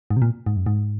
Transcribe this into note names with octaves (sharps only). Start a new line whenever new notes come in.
G#2
C3
A#2
G#2
F#2
G#2